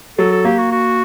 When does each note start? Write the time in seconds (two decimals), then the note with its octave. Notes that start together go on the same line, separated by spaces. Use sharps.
0.18 F#3 A4
0.32 A4
0.45 A#3 G4
0.58 F#4
0.72 F#4